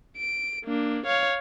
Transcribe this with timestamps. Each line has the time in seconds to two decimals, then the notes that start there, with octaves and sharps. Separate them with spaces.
0.17 D7
0.65 A#3 D4
1.06 C#5 F5